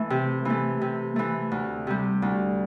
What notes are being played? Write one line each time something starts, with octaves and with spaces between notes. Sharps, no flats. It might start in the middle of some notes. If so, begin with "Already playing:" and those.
Already playing: E3 A3
C3
E3 A3
C3
E3 A3
D2
C3 G3
D2